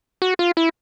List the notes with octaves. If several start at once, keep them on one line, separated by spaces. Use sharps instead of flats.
F#4
F4
E4